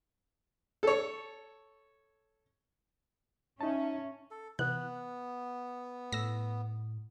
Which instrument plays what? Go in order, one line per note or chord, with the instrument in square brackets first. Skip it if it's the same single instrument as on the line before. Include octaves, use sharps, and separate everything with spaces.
[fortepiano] A4 C#5
[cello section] C#4 [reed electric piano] D#4 A5 [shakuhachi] E5
[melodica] A4
[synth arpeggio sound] C3 E3 F#6 [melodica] B3
[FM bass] A2 [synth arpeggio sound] E6 A#6